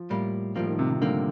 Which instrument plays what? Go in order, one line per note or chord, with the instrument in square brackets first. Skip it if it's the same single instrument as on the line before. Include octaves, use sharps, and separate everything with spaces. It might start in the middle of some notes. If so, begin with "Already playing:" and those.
Already playing: [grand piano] F3
[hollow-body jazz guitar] A2 G3 A#3
[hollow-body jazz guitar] A2 G3 A#3 [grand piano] F3
[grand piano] D#3
C3
C3
[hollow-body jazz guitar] A2 G3 A#3 [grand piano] D3